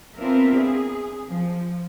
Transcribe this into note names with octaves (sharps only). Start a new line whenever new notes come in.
B3 C4 D4 F4 A#4 E5
G#4
F3